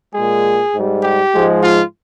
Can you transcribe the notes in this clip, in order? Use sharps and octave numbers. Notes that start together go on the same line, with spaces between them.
A#2 G#3 G#4
G#2 G3
G4
G#2 F3 G#3
F4